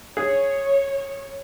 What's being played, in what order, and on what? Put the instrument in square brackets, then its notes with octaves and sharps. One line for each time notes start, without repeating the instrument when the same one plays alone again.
[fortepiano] G#4 [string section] C#5